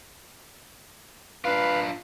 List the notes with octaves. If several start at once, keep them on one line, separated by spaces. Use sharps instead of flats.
D4 F4 B4 F5